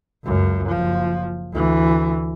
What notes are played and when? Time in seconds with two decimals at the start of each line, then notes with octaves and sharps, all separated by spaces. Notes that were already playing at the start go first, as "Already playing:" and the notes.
0.25 C#2 F#2
0.68 F#1 F3
1.53 D2 E3